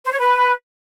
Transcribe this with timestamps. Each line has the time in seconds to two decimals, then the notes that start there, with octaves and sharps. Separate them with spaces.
0.04 C5
0.11 C#5
0.18 B4